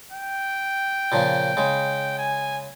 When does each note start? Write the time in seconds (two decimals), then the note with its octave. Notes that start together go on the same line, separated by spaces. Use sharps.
0.12 G5
1.12 A#2 C#3 F3
1.57 C#3 G#3
2.18 G#5